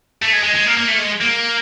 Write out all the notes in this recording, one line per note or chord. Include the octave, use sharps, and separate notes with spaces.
A3
G#3
G#3
G#3
A#3
A#3
A3
G#3
A#3